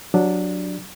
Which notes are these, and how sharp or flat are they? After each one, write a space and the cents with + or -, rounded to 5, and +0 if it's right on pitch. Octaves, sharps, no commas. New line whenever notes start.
F#3 -10 D4 +0 G4 +15